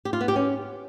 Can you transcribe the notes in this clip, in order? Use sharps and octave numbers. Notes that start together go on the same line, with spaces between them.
G4
F4
B3
G4
C#4